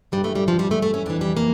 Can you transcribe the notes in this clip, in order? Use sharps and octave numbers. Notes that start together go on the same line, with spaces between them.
G2 E3 G3
A3
G3
F3
G3
A3
A3
C#4
F2 E3 D4
G3
A#3